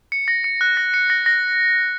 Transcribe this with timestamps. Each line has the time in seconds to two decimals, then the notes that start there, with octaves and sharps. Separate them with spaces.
0.12 C#7
0.28 A#6
0.44 C#7
0.61 F#6
0.77 A#6
0.94 C#7
1.10 A#6
1.26 A#6